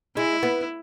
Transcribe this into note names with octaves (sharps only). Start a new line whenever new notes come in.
G#3 E4
B3